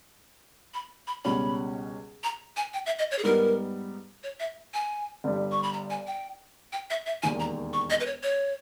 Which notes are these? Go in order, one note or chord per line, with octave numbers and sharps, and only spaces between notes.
B5
B5
C#2 B2 G3 C#4 B5
A#5
G#5
G5
E5
D#5
C#5
G#4
G#2 G3 B3 D#4 A#4
C#5
E5
G#5
G1 G2 G3
C#6
B5
A#5
G#5
G5
G5
E5
E5
E1 D#2 D#3 G#5
A#5
C#6
D#5
B4
C#5
C#5